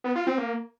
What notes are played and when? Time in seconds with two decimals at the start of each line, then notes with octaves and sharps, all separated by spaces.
0.04 B3
0.16 F4
0.27 C4
0.38 A#3